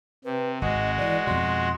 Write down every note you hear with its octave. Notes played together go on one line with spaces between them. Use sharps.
C3 B4
G#1 G#3 F#4 D#5
D#3 E3 D5
F2 B2 C6